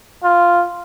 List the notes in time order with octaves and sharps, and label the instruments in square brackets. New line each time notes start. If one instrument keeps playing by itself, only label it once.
[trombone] F4